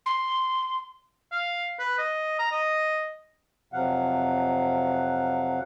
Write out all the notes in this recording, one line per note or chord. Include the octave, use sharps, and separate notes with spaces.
C6
F5
B4
D#5
A#5
D#5
F2 C3 F#3 F5 F#5